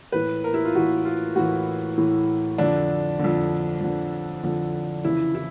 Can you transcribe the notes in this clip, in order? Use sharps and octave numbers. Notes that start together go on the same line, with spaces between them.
A2 E3 B4
A#4
E4
F4
A2 E3 F#4
F4
A2 E3 F#4
A2 E3
F2 D3 D4
F2 D3
F2 D3
F2 D3
F2 C#3 E3 E4
E4